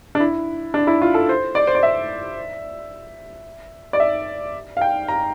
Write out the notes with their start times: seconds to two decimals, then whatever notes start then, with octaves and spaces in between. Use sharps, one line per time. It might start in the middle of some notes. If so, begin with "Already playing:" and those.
0.15 D4
0.20 E4
0.74 D4
0.87 E4
1.02 F4
1.14 A4
1.29 C5
1.55 D5
1.67 C5
1.75 D5
1.83 E5
3.93 D5
4.00 E5
4.77 F5
4.81 G5
5.08 A#5